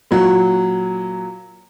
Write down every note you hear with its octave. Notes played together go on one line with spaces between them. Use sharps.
A#2 F#3